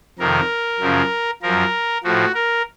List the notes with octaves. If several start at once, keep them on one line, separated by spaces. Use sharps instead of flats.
F2 C3 D#3 A#4
F#2 C#3 F3
F#2 F3 A#4
A2 F3 F#4
A#4